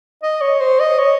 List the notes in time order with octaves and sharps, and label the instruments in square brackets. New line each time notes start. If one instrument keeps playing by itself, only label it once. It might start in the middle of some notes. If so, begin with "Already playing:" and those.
[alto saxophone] D#5
C#5
C5
D#5
C#5